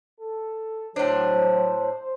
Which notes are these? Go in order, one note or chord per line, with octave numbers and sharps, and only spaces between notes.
A4
A2 F#3 D4 C5 C#5